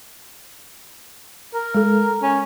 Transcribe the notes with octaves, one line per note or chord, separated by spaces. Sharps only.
A#4
G#3 A4
C#4